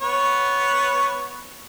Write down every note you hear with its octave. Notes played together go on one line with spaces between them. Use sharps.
B3 C#5